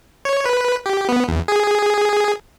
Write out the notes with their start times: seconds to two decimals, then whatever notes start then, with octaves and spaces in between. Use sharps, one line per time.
0.25 C#5
0.46 B4
0.86 G4
1.09 B3
1.28 E2
1.48 G#4